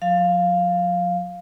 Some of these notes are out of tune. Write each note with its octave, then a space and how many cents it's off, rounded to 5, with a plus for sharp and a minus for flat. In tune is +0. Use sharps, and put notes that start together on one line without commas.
F#3 -45 F5 +0